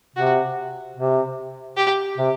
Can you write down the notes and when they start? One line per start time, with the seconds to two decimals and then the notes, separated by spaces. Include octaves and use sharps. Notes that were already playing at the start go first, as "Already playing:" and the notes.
0.16 C3 F#4
0.97 C3
1.77 G4
2.18 C3